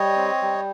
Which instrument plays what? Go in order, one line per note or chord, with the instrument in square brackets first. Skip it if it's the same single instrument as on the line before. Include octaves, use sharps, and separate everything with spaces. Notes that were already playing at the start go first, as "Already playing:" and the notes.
Already playing: [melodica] G3 C#5 D#5
C4
G3